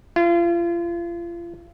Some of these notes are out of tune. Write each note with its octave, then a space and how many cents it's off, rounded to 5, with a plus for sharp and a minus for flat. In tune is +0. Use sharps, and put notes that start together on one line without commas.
F4 -35